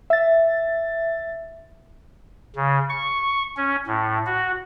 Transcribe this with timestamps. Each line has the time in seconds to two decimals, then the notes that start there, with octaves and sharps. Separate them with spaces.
0.10 E5 A6
2.56 C#3
2.89 C#6
3.57 C#4
3.86 A2
4.26 F#4